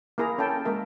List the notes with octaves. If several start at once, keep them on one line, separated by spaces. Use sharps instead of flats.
A#3 E4 G#4 A#4 A#5
C#4 A4 F5 G5 A5
G#3 A#3 A#4 E5